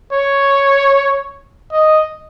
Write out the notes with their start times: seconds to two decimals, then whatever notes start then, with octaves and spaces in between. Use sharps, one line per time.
0.13 C#5
1.72 D#5